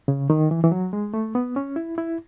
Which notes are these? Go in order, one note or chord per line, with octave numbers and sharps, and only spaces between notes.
C#3
D#3
E3
E3
F#3
G#3
A3
B3
C#4
E4
E4